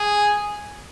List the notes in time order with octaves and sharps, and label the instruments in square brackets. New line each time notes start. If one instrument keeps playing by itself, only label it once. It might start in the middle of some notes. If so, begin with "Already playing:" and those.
Already playing: [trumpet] G#4